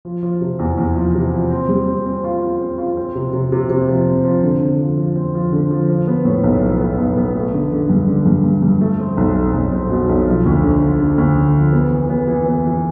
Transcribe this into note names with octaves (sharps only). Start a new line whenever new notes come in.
F3
F3
C3
E2
E2
F3
C3
F3
C4
G3
C4
C4
F4
F4
C4
F4
C4
C3
C3
C3
C3
F3
C4
F3
D3
D3
F3
F3
C4
F3
D3
F3
F3
B3
A2
B1
F3
B3
B1
B3
A3
D3
D3
G2
D3
G2
G2
G2
A3
C4
B1
C4
B1
C4
B2
B1
F3
D2
D3
F3
D3
D2
D3
F3
B3
E3
B3
E3
B3
E3